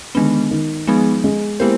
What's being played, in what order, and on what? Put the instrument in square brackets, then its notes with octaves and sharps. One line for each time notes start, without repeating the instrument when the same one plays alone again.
[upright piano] D3 [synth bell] D#3 G#3 B3
[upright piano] D#3
[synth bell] F3 G#3 B3 D#4 G#4
[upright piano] G#3
[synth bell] G#3 B3 E4 G4 C5 [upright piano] A#3